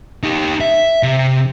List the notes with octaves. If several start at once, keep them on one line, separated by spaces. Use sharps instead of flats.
D#4 G4
E5
C3